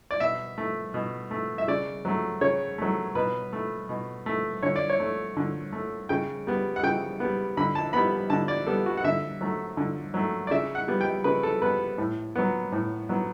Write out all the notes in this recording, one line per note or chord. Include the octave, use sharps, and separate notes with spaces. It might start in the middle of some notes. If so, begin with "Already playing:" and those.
D5
B2 E5
A3
B2
A3
E5
C#3 D5
F#3 A3
C#3 C#5
F#3 A3
B2 B4
A3
B2
A3
D3 C#5
D5
C#5
A3
D3
A3
C#3 G5
G3 B3
F#5
C#3 G5
G3 B3
D3 B5
A5
G3 B3 B5
D3 A5
D5
G3 B3 A4
F#4
F#5
D3 E5
F#3 A3
D3
F#3 A3
D5
C#3 E5
F#5
G3 B3
G5
C#3 B4
A4
G3 B3 B4
A2
F#3 B3
A2
F#3 B3